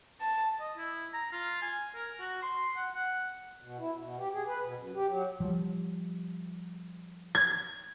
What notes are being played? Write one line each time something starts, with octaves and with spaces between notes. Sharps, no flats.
A5
D#5
E4
A#5
F4
G#5
A#4
F#4
C6
F#5
F#5
B2
E4
B2
G4
G#4
B4
B2
F#2
G4
F#3
F3 G3
G#6